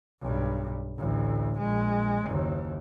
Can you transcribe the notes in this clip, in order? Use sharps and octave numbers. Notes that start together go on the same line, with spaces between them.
B1 G2
A1 D2
A#1 G#3
F#1 D#2